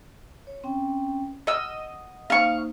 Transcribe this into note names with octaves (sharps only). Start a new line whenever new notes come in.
C#5
C4 C#4 G5
D#5 F#5 E6
A#3 D#4 C5 F5 C#6